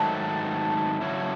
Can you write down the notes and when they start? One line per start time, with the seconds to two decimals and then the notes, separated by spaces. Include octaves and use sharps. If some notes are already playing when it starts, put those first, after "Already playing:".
Already playing: G#2 D#3 F#3 A3 A5
1.01 C#3 F#3 C#4 E4